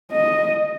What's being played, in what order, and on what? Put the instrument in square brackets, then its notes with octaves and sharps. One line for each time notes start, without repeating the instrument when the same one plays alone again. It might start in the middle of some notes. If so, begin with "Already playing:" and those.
[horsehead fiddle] D#5